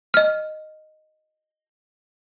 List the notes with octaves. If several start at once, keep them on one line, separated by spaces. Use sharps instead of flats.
D#5 F6